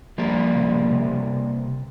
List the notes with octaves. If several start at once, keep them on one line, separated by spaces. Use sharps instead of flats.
F3 G3 A#3
C3
C3